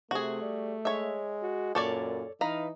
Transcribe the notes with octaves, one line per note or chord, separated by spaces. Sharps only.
C3 A3 F#4 G#4
G3
G#3 C#5 E5
F#4
F#2 A#2 A4 C#5 D5
E3 D#4 B4 F5 A#5